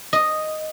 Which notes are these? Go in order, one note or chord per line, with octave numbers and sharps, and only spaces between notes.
D#5